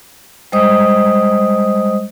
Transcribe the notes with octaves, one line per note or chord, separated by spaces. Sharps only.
G3 G#3 C5 D#5 D#6